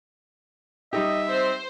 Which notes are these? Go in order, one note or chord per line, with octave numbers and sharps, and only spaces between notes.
G3 D#4 G4 D#5 E5
C4 C5